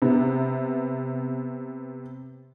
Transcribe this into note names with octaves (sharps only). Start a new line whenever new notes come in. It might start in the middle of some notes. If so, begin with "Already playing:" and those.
C3 B3